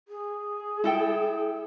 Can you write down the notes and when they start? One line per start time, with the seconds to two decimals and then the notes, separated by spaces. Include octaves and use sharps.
0.08 G#4
0.84 E4 A4 G5